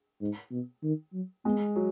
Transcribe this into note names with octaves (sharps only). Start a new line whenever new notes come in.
G#2
B2
D#3
F#3
G#3 B3
F#3